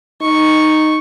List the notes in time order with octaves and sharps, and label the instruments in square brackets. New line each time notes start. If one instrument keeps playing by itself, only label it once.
[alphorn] D#4 [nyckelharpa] C#6